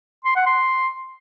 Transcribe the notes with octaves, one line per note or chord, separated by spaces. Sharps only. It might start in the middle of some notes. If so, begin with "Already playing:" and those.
C6
F#5
C6